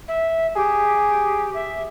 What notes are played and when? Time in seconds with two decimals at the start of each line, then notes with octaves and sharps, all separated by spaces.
0.08 E5
0.56 G4 G#4
1.54 E5